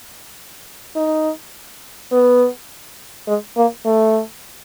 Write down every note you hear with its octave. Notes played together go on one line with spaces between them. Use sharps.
D#4
B3
G#3
A#3
A3